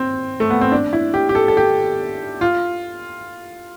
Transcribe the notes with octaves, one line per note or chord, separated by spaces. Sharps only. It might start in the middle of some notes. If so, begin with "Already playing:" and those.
Already playing: C4
A3
B3
C4
D4
E4
G4
G4
A4
A4
G4
F4